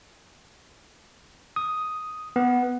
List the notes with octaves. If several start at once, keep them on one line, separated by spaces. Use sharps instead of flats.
D#6
B3